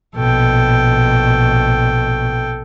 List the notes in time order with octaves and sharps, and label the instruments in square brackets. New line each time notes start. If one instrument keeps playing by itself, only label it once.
[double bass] A#1 B2 [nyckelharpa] A4 G5